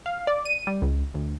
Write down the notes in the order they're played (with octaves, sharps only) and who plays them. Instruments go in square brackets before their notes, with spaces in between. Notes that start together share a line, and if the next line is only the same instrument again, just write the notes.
[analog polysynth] F5
D5
D#7
G3
C#2
D2